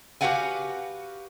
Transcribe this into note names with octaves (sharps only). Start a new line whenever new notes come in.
F#4 G4 B4 F5 F#5 G#5